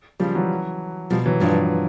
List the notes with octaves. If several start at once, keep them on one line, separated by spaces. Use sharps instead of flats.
C#3 F3 G3
E3 F#3
B2 F3 G3
E3 F#3
G2 F3